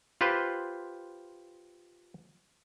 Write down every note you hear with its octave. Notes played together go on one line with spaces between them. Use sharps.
F4 G4 B4 C5